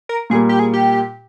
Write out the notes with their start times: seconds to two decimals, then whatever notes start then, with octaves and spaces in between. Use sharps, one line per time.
0.09 A#4
0.30 A#2 G3 A#3 G#4
0.49 G4
0.59 G#4
0.73 G4